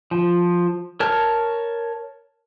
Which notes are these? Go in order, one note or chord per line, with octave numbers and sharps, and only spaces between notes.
F3
A#4 C#5 A5 F6